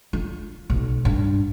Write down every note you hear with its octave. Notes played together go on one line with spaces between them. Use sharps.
F4
B1
G2